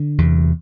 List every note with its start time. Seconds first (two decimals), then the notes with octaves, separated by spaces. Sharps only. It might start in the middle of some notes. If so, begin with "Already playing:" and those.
Already playing: D3
0.18 E2 C3